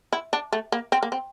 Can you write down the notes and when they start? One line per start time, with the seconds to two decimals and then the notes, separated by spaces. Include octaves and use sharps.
0.13 E4
0.33 D4
0.53 A3
0.72 A#3
0.92 C4
1.03 A#3
1.12 C4